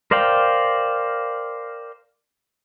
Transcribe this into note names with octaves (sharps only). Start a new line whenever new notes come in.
A#4 C5 D5 F5 G5